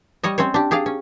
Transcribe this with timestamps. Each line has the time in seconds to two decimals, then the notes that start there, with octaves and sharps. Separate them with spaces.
0.23 G3 C#5 D#5
0.38 C4 C#4 C5 C#5
0.54 D4 G4
0.71 G4 G#4 D5 F5
0.86 C#4